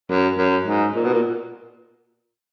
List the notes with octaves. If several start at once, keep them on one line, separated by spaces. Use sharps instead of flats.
F#2
F#2
G#2
A#2
B2
A#2